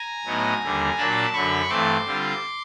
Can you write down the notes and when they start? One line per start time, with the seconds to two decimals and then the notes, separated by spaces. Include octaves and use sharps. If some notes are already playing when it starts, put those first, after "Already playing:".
Already playing: G#5 A#5
0.25 A2 F#3 B3 D#4
0.61 D#2 D3 G3
0.97 A#2 F#3 A#3 D4 A5 B5
1.33 F#2 D3 F#3 B5 C#6
1.68 G2 E3 A3 C4 C6 D6
2.05 D3 G3 C4 F4